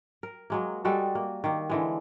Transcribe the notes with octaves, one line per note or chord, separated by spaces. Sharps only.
A#4
F#3 G#3 A#3
G3 G#3 F#4 A4
A#3
D#3 A#3
D3 E3 G#3